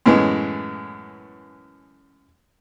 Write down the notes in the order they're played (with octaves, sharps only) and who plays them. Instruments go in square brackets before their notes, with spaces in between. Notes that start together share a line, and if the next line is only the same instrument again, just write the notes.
[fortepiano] F#2 A2 E3 G#3 B3